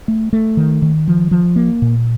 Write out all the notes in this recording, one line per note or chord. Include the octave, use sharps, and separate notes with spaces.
A3
A3
D#3
D#3
F3
F3
A#3
A#2